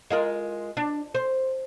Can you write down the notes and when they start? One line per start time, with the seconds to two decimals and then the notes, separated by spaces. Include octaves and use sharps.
0.10 G#3 F4 A#4
0.77 D4
1.15 C5